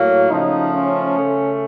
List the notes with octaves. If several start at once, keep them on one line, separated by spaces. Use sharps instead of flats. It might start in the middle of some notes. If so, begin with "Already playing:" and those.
Already playing: A2 F#3 A#3
C#3 F3 A3 D#4
C#4
C#3 A3